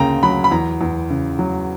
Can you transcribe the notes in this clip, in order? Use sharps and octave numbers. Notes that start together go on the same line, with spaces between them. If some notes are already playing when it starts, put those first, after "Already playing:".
Already playing: D2 C#3 A#3 G5 A#5
F#3 B5
B5
E2 A#5
E2
C#3
F#3